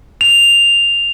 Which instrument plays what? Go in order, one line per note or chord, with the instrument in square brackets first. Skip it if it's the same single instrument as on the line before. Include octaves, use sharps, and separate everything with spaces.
[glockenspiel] F7